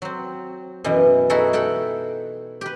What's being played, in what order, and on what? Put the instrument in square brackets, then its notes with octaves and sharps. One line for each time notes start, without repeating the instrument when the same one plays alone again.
[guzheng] F#3 C4
F#2 B2 E3
D#4 E4 F#4 G#4 A4
A4 F#5 G5 A5
G4 B4